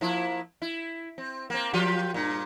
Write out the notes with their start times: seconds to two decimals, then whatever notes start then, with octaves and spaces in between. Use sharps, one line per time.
0.01 F3 A#3 E4
0.62 E4
1.18 C4
1.50 A#3 C4
1.73 F3 F4 G4
2.14 G2 A#2